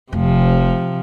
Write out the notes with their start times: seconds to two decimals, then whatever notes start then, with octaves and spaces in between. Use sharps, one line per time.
0.13 F1 C3 F3